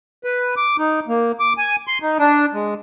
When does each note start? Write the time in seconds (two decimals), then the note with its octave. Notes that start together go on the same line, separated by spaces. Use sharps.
0.24 B4
0.57 D6
0.78 D#4
1.08 A#3
1.40 D6
1.58 G#5
1.87 C6
2.02 D#4
2.19 D4
2.53 G#3